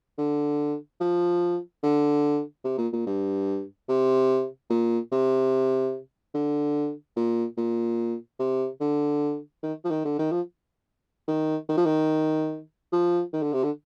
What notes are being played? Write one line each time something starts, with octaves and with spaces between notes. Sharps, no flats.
D3
F3
D3
C3
A#2
A#2
G2
C3
A#2
C3
D3
A#2
A#2
C3
D3
D#3
F3
D#3
D3
D#3
F3
D#3
D#3
F3
D#3
F3
D#3
D3
C3
D3